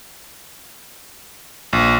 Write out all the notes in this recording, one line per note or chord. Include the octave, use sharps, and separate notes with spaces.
A#1